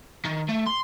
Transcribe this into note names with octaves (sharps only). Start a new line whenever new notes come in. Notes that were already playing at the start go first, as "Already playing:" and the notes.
D#3
A3
C6